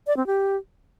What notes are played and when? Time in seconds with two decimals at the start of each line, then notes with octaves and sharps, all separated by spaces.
0.07 D5
0.17 C4
0.27 G4